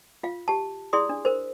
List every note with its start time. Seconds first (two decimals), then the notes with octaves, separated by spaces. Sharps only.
0.23 F4 F5
0.48 G4 A5
0.93 E4 G#4 D5 C6 D#6
1.09 D4
1.25 A#4 C5